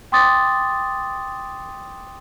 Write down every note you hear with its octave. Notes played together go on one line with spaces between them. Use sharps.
G5 C6 D6 D#6 A6